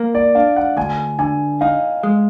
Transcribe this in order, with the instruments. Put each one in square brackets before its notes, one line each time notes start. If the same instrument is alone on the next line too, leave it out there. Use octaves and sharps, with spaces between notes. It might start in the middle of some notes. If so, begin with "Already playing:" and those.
Already playing: [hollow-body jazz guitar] A#3
[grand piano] D5
[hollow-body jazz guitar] D4 [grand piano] F5
[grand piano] F#5
[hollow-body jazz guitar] D2 [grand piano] G#5
[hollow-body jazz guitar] D3 [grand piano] G#5
[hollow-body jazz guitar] D#4 [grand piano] F5
[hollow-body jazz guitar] G#3